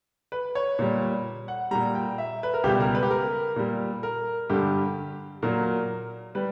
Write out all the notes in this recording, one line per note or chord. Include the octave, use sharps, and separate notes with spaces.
B4
C#5
A#2 G3
F#5
A#2 G3 A#5
G5
E5
B4
A#4
C#2 B2 G3 G4
A#4
B4
G4
A#4
A#2 G3
A#4
G2 D3 G3 G4
A#2 F#3 A#4
G3 B4